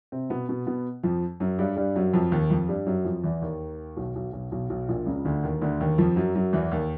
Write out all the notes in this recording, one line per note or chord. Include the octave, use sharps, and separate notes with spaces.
C3 C4
B2 B3
B2 B3
B2 B3
F2 F3
F#2 F#3
G2 G3
G2 G3
F#2 F#3
F2 F3
D#2 D#3
F2 F3
G2 G3
F#2 F#3
F2 F3
E2 E3
D#2 D#3
B1 B2
B1 B2
B1 B2
B1 B2
B1 B2
A#1 A#2
C#2 C#3
D2 D3
D#2 D#3
D2 D3
D#2 D#3
F2 F3
F#2 F#3
F#2 F#3
E2 E3
D#2 D#3